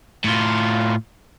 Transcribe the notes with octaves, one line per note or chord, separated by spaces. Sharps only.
A2 F4